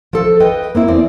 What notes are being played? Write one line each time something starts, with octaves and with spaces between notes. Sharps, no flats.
F3 A4
B4 D#5 G5
A#3 C4 E4 C5
E2 F3 C4 D5